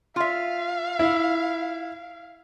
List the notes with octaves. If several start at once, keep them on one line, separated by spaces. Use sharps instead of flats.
F4 E5 F5
E4